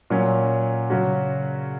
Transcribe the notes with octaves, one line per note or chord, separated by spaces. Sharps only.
A#2 F#3 C#4
C#3 F#3 C#4 F#4